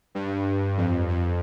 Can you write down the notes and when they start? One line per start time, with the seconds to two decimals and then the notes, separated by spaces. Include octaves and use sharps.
0.15 G2
0.78 F2
1.09 F2